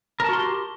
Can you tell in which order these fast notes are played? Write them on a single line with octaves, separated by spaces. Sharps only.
A#4 A5 F#4 C6 G4